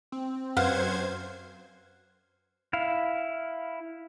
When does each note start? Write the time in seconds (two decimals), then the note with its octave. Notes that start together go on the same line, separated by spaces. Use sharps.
0.12 C4
0.57 F#2 B4 C5 F5 F#5 F6 G#6
2.73 E4 F5